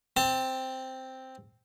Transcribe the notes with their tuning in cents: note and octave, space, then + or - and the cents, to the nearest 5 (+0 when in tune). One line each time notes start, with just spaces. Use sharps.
C4 +0 A5 +30